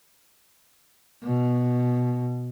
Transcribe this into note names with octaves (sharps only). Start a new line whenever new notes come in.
B2